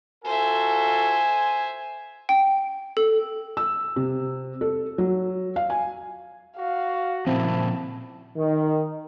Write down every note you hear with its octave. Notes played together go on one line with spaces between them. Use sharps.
F4 F#4 A4 C5 E5 G#5
G5
A4
E6
C3
A4
F#3
F5
G#5
F#4 F5
A#2 C#3 F3 C4 E4 A5
D#3